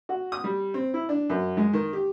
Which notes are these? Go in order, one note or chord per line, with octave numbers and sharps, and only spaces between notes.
F#4
D#6
G3
C4
E4
D4
F#2
G#3
D#3
G4